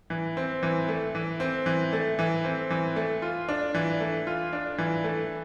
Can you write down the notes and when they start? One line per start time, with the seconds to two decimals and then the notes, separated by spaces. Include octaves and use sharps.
0.10 E3
0.37 C4
0.63 E3
0.89 A3
1.15 E3
1.40 C4
1.66 E3
1.93 A3
2.19 E3
2.45 C4
2.70 E3
2.96 A3
3.22 F4
3.49 D4
3.74 E3
4.00 A3
4.27 F4
4.53 D4
4.78 E3
5.04 A3